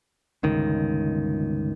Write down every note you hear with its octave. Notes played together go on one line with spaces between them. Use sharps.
G1 C#2 D#3